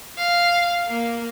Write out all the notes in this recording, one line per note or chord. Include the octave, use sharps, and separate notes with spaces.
F5
A#3